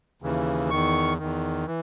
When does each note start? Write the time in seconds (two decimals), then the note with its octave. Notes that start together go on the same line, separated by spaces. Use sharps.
0.22 D#2 C#3 E3
0.70 E2 D#3 C#6
1.18 E2 D#3
1.67 E3